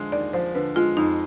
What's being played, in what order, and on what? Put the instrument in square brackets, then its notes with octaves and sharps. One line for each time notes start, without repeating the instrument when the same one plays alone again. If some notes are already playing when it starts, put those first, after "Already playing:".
Already playing: [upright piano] D3 F3 G#3
[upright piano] D#2 [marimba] D5
[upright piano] F3 [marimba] C5
[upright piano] D3 [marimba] B4
[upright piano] G#3 [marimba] F4
[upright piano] F2 [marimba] D#4